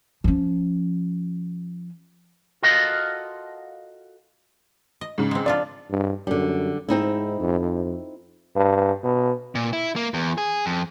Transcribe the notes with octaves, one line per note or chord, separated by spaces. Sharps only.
F3 C#4
F4 F#4 A4 A#4 D#5 F5
D#5
G#2 C#3
G#3 C4
F3 D4 F4 D5
G2
F#2 D3 G3
G#2 C4 D#4 E4
F2
G2
B2
A#2
E4
A#3
E2
G#4
F2